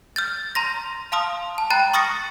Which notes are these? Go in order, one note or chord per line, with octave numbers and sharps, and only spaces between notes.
F6 G6 A6
A#5 C6 A#6
F5 A5 C6 D#6 F6
A5
G5 A#5 B5 F#6 A6
C#6 D#6 F6 A6 A#6 C#7